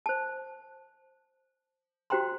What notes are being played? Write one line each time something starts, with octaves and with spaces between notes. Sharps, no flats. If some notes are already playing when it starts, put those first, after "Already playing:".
C5 A5
F#4 G4 C5 G5 A#5 C6